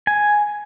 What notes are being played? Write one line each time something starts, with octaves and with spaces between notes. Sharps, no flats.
G#5